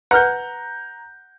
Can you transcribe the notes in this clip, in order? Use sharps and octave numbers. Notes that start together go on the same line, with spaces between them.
B4 F#5 A#5 F6 G6